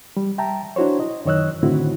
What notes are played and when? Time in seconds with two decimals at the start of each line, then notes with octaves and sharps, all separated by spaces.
0.17 G3
0.38 E5 G5 A5 A#5
0.76 D4 E4 F#4 C5 C#5
1.00 D#5
1.25 F#2 D#3 C#5 D#5 E6 F#6
1.63 A2 D3 D#3 C4 E4 F#4